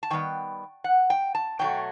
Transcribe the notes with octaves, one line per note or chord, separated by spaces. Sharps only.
A5
D#3 G3 B3 G5
F#5
G5
A5
B2 F#3 A3 G5